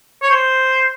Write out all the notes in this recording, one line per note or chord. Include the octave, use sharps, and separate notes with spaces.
C#5
C5